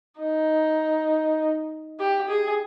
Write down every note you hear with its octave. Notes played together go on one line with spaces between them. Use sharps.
D#4
G4
G#4